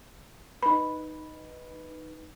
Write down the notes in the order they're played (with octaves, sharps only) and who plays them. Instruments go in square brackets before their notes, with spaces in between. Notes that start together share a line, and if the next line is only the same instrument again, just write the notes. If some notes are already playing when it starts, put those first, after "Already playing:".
[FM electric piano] D#4 B4 [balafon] B5